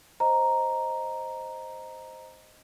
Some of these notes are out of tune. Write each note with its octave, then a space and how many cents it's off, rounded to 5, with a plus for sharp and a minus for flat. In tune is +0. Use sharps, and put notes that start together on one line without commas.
C5 +0 D#5 +0 A#5 +0